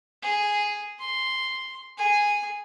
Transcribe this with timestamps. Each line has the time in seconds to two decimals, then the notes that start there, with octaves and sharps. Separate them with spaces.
0.22 G#4
1.00 C6
1.98 G#4 G#5